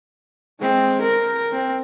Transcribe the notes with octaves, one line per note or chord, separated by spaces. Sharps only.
G#3 C4
A#4
C4